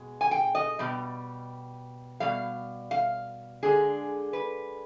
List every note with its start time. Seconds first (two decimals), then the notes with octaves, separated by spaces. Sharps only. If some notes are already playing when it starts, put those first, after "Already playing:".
Already playing: B2 G#3
0.21 G#5
0.31 G5
0.55 D#5
0.79 B2 G3
2.20 B2 G3 F5
2.91 F5
3.63 D3 G#3 G#4
4.33 B4